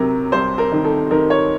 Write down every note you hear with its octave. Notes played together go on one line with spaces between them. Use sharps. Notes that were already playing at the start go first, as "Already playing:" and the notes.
Already playing: C3 F#3 A#4
C2 C5
A#4
D#3
A4
D#3 A#4
C#5